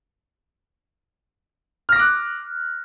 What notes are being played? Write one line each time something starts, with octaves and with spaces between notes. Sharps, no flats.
D6 F6 F#6 A#6